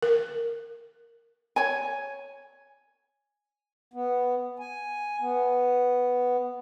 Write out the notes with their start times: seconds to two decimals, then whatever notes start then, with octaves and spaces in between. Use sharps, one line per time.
0.03 A#4
1.56 C#5 G#5
3.94 B3
4.59 G#5
5.21 B3